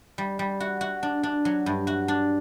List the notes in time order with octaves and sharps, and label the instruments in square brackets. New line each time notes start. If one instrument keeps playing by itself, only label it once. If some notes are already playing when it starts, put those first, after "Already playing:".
[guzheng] G3
G3
F#4
F#4
D4
D4
F#3
G2
F#4
D4